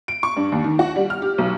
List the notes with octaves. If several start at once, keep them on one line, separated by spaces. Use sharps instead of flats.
D7
C#6
G2
D#2
D#3
F#4
G3
F6
G4
B1